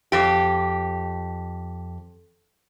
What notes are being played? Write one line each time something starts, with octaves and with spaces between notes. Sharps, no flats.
F2 G4